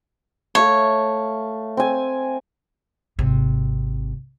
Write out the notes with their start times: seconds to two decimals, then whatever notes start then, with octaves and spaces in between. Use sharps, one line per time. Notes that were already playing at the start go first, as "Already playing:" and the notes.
0.55 A3 C#5 E5 F5
1.77 C4 G#5
3.19 G#1 C3